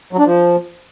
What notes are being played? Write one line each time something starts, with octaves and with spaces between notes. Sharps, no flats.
F#3
D4
F3